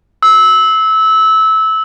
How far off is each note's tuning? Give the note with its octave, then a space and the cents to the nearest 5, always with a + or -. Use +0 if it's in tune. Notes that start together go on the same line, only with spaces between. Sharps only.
E6 -20